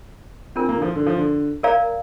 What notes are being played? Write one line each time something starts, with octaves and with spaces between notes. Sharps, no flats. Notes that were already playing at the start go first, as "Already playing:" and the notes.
C4 D4 F4 A#4
A#3
D3
F3
D3
F3
D3
A#4 D5 F5 A#5